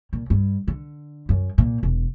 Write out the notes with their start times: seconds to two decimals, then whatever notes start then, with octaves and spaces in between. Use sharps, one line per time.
0.13 A#2
0.30 G2
0.68 D3
1.29 F#2
1.58 A#2
1.83 E1